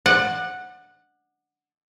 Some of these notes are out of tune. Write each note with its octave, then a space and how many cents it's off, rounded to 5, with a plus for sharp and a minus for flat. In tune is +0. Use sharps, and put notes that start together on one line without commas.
D5 +35 F#5 -5